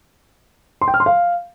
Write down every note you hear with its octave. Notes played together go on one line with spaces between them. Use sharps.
C6
G5
F6
C6
F5